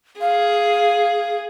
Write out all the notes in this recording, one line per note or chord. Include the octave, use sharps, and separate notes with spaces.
G#4 F5